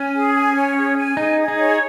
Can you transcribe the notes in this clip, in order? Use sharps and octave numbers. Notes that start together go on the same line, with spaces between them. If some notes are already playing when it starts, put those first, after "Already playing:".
Already playing: C#4 G#5
G#4
G#5
C#5
G#4
G#5
D#4 G#4
G#4
D#4
C#5